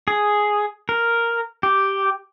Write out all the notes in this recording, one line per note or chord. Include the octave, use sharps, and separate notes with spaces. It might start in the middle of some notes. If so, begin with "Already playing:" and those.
G#4
A#4
G4